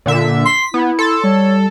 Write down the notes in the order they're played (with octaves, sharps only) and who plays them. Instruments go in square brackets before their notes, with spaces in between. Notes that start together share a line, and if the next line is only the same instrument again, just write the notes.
[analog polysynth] A#2 D3 E5
[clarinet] C6 [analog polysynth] B6
[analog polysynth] B3 [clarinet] E4
[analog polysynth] A4 [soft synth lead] C6
[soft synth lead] G3 [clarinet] C#5